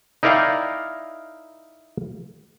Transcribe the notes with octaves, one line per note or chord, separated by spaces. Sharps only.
D#4 E4 A#4 D5 F5 G5